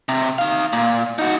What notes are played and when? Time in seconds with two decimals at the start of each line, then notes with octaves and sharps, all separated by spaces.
0.09 C3
0.39 D#4 F5
0.73 A#2
1.19 D#4 F#4